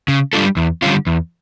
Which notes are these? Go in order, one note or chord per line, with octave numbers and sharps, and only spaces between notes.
C#3
G3 D4 F4 A4
E2
D3 G3 C#4 F4
E2